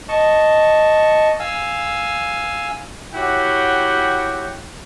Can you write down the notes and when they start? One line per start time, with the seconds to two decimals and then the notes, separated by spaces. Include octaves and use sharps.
0.09 D#5 A5 C#6
1.39 F5 G#5 E6
3.14 E4 F#4 G4 C#5 F#5 G5